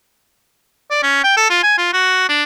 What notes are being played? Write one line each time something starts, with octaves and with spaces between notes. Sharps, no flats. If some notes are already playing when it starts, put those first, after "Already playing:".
D5
C#4
G5
A4
F4
G#5
F4
F#4
D4